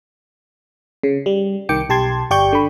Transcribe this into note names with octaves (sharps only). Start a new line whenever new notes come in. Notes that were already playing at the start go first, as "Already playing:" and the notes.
C#3
G3
C2 D#3 G5 D6 C#7
B1 G4 A5 C6 G#6
G1 G4 D5 G5 C#6 G6
D3 B5